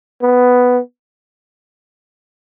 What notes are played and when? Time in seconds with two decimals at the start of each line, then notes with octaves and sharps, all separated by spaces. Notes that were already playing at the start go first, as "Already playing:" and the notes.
0.22 B3